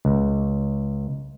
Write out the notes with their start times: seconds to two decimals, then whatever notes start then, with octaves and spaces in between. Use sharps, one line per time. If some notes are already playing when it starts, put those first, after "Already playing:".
0.05 C#2